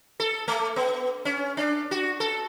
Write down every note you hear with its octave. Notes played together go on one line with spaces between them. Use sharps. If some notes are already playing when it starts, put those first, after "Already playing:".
A4
A3
B3
C#4
D4
F#4
A4